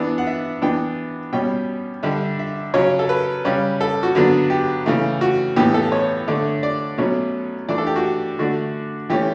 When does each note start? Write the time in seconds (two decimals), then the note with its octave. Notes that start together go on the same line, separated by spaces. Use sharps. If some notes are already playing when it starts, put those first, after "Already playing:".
Already playing: E3 B3 D4
0.18 F#5
0.27 E5
0.62 E3 B3 D4 G5
1.33 B2 G3 C#4 G5
2.03 D3 G3 D4 E5
2.39 E5
2.74 C#3 F#3 C#4 C#5
2.99 A4
3.09 B4
3.45 C#3 G3 C#4
3.81 A4
4.03 F#4
4.15 D3 F#3 B3 D4
4.50 G4
4.86 C#3 E3 A3
5.21 F#4
5.56 A2 E3 B3 G4
5.74 A4
5.92 C#5
6.28 D3 A3 D4
6.63 D5
6.98 B2 F#3 A3 C#4
7.69 E3 A3 D4 D5
7.78 A4
7.87 G4
7.96 F#4
8.04 G4
8.39 D3 A3 D4 F#4
9.10 E3 A3 C#4 G4